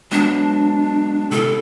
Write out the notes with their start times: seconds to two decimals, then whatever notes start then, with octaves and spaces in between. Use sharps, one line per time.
0.12 F#3 G#3 B3 D4
1.31 C3 E4 A4